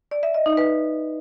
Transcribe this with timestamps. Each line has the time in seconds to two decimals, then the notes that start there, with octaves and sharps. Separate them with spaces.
0.11 D5
0.23 E5
0.34 D#5
0.46 D#4
0.57 B4